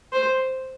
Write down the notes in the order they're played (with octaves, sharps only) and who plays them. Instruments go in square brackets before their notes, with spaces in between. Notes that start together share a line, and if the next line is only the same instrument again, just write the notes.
[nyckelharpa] C5